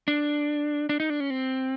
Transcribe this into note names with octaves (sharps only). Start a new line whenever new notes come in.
D4
D4
D#4
D4
C#4
C4